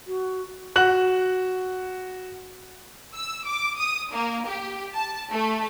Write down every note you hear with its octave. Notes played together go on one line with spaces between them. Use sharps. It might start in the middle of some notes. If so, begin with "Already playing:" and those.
F#4
F#4 F#6 F#7
E6
D6
D#6
A#3
G4
A5
A3